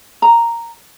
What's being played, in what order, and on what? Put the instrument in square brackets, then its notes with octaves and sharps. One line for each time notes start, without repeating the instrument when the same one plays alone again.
[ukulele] A#5